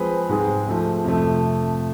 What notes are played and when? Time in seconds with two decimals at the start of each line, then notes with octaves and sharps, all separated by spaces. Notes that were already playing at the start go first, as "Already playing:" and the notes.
Already playing: F3 G#3 C4 G#4 B4
0.29 G#2 G#3 C4 G#4
0.67 F3 A3 C4
1.04 F2 C3 F3 A3